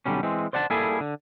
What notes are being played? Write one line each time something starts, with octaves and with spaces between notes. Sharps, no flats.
B1 G#2 D3 G3 C#4
E3 G#3 C4
C5 D5 F#5 G#5 A5
G3 A#3 E4 G#4 A4 G#5
D3